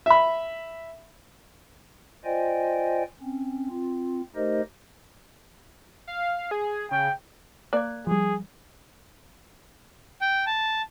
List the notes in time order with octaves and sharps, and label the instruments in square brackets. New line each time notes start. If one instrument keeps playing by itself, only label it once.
[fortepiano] E5 B5
[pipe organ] F4 C5 D5 D#5 G5 G#5
C4 C#4
C4 F4
A3 D#4 G4 A#4 C5 D#5
[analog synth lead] F5
G#4
[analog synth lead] C#3 [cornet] G5
[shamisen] A#3 D5 [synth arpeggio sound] F#6 G#6
[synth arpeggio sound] F3 G3 [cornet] G#4
[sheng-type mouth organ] G5
A5